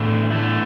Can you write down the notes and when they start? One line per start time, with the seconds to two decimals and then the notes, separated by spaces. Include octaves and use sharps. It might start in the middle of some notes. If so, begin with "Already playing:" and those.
Already playing: E2 A2 D3 A3 E4
0.30 E2 D3 A3 E4